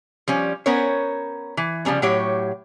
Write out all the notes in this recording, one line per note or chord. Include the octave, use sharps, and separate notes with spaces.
F3 G3 C#4
B3 C#4 A#4 C5 C#5
E3
C#3 F3 G3 A#3 C#4
A2 F#3 G4 C#5